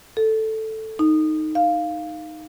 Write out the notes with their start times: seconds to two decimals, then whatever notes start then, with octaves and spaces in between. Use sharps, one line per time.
0.17 A4
0.99 D#4
1.55 F5